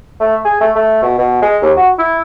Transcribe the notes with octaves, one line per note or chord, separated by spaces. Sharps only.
A3
G#4
A3
A3
B2
B2
G#3
D#2
F#4
E4